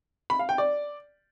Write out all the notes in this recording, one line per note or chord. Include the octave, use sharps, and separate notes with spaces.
B5
F5
G5
D5